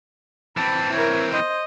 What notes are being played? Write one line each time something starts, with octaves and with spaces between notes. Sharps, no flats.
E3 C4 A5 B5
E4 A#4 C#5
C5 D#5